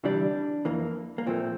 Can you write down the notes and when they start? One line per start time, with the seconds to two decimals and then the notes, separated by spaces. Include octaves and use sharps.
0.04 D2 C3 E3 G3 D4
0.65 F2 E3 A#3
1.18 A#3
1.26 A#2 F3 A3 C4